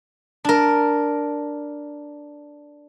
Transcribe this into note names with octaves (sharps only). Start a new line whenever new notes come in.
D4 A#4